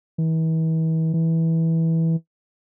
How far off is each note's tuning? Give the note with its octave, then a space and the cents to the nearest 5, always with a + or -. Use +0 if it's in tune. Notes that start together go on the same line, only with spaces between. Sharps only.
E3 -40
E3 -15